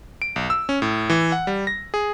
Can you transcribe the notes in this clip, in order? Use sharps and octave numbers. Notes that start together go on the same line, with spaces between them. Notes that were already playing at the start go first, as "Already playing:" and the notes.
D7
B1
E6
C#4
A2
E3
F#5
G3
A#6
G#4